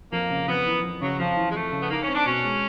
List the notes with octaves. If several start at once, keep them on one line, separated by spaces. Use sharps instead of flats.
F2 A#3
C#3
F2 B3
E3
F2
C#3 F#3
F2 F3
E3
G#3
F2 A3
C#3
B3
A#3 D#4
C#4
C4
D4
B2 C#4
G#3